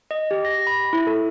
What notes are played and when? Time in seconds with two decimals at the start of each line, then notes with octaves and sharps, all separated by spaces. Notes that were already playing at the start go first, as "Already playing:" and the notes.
0.11 D#5
0.31 G4
0.45 A#6
0.67 B5
0.93 E4
1.07 A4